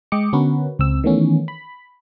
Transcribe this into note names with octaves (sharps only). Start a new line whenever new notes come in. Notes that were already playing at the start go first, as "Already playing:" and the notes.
G#3 D#5 G5 D6 C#7
D3 B3 C#4 F#4 A#4 B4
C#2 C4 E6
D#3 E3 A3 B3 C#4
B5